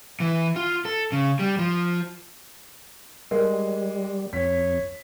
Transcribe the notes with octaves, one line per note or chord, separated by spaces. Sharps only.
E3
F4
A4
C#3
G3
F3
G3 G#3 A#4
F2 C#5 B6